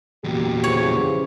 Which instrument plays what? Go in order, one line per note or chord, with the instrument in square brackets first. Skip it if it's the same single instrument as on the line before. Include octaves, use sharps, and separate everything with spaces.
[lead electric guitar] E2 A#2 [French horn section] F#4 G4
[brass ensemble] C#3 E3 F3 [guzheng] C#5